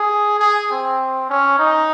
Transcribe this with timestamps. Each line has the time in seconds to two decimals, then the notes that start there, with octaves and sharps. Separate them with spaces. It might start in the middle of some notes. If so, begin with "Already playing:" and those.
Already playing: G#4
0.40 G#4
0.70 C4
1.29 C#4
1.59 D#4